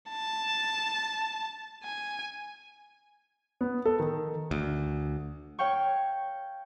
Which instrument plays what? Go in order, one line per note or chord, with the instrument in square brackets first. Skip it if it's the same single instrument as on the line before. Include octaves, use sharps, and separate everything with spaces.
[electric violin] A5
G#5
[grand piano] B3
A4
D#3
[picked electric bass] D2
[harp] C#5 F5 G5 C#6